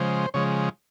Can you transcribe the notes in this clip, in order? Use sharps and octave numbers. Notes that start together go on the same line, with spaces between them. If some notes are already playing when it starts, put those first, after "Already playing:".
Already playing: C#3 F3 G#3 C5
C#3 F3 G#3 C#5